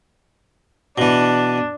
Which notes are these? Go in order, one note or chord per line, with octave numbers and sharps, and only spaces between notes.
B2 E3 D4